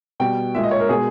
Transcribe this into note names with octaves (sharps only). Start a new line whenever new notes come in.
B2 G3 G5
A#2 G#3 E5
D#5
C#5
A#4
B2 G#3 G#4